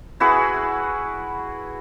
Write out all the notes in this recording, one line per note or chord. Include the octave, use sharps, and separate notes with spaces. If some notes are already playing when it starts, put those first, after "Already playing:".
E4 F#4 G#4 B4